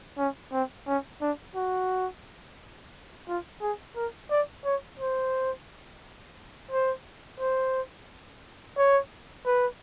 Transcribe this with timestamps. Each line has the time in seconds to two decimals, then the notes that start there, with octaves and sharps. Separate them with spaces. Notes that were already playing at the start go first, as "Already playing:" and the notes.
0.18 C#4
0.52 C4
0.87 C#4
1.21 D4
1.55 F#4
3.28 F4
3.62 G#4
3.96 A#4
4.31 D5
4.65 C#5
4.99 C5
6.71 C5
7.40 C5
8.78 C#5
9.46 B4